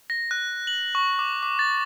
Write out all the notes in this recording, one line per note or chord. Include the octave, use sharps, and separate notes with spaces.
A#6
F#6
F#7
C#6
D6
D6
A6